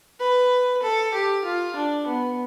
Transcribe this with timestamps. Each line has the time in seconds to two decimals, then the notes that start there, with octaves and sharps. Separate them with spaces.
0.20 B4
0.83 A4
1.14 G4
1.45 F4
1.76 D4
2.07 B3